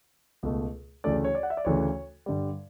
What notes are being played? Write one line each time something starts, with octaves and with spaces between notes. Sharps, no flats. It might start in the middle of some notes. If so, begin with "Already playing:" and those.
C#2 B2 A3
D2 C#3 E3 A3 C#4 D5
C#5
D5
F#5
E5
D5
D2 C#3 E3 A3 C#4 C#5
G2 D3 G3